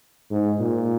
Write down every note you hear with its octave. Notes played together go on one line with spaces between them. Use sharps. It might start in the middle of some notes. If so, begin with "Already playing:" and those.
G#2
A#2